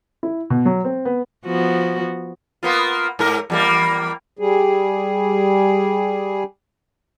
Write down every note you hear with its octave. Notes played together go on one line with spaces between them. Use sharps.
E4
B2
F#3
C4
B3
F3 B3 F#4
A#3 B3 F4
G#2 A#4
E2 G3 A#3
G3 G#4